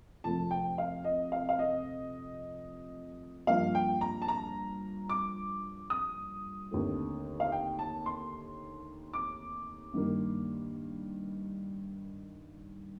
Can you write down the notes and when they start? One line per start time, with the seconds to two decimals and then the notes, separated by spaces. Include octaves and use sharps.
0.24 F2 C3 F3 A3 C4 A5
0.51 G5
0.78 F5
1.04 D#5
1.32 F5
1.49 F5
1.59 D#5
3.47 G2 F3 A#3 F5
3.75 G5
4.01 A#5
4.22 A5
4.28 A#5
5.09 D6
5.90 D#6
6.71 D#2 D3 A3 C4
7.40 F5
7.52 G5
7.79 A5
8.06 C6
9.13 D6
9.94 G2 D#3 A#3